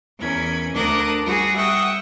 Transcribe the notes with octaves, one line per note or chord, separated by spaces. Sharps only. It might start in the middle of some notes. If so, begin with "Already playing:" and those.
E2 C#4 A#4 B5 G#6
D2 D4 A#4 D6 D#6 F#6
G3 F#4 G#4 A#6
E5 F#5 G5 C#6 D#6